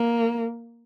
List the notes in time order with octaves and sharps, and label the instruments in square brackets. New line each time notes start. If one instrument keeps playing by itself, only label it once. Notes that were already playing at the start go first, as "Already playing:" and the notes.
Already playing: [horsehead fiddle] A#3